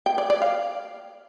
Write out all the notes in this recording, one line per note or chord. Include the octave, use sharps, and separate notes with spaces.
G5
D5
D5
F5